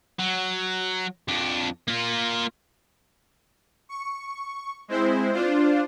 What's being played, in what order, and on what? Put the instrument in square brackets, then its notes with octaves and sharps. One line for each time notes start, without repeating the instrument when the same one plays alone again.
[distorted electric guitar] F#3
F2 D4
A#3 F4
[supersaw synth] C#6
G#3 C4 E4 C5
D4 F4 C5